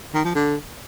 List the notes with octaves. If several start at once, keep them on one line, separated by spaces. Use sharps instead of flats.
D#3
F3
D3